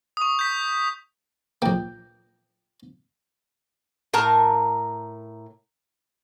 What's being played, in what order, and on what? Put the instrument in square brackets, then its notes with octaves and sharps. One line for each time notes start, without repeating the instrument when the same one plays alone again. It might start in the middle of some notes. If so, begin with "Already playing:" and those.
[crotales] C#6 D#6
G6 B6
[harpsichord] A#1 A#3 [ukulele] G5
[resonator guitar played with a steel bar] A2 A#4 A5 A#5